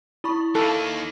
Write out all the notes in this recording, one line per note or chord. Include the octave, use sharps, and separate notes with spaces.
E4 B5 C#6
D#2 A#3 A4